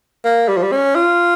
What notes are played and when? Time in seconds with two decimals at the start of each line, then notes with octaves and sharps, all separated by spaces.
0.25 A#3
0.49 G3
0.57 F3
0.63 G3
0.72 C#4
0.95 F4